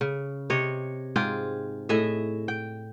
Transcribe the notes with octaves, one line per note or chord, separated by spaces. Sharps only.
C#3
C3 C#5 D#5
G#2 F4 G#4 G5
A2 G#4 D#5 E5
G5